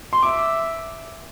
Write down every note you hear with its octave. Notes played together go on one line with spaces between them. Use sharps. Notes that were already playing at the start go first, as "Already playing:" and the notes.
C6
E5 D6